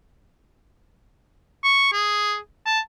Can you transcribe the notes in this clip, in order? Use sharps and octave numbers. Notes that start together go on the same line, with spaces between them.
C#6
G#4
A5